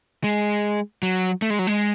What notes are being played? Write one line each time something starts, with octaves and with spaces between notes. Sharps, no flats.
G#3
F#3
A3
G#3
F#3
G#3